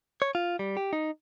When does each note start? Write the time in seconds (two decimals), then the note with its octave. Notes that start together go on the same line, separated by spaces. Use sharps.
0.22 C#5
0.35 F4
0.59 G3
0.77 G4
0.93 D#4